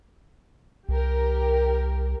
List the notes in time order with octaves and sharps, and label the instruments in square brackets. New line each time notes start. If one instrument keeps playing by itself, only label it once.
[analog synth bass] C2 [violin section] G4 A#4